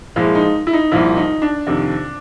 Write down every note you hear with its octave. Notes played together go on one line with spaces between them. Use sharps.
A#2 F3 G#3 E4
D#4
E4
D#4
C2 A#2 F3 E4
D#4
D4
F2 C3 D#3